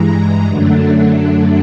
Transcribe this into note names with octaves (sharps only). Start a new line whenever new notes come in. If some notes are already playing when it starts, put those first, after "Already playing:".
Already playing: G2 E3 G#3 A#5
F#2 D3 F#3 A3 D4